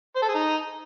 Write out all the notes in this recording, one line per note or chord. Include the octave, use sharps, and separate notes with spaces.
C5
A4
G#4
D#4